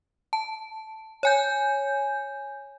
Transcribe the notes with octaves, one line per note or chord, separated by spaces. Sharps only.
A5
C#5 G#5 G6